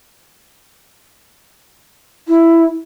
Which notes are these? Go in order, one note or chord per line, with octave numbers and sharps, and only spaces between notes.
E4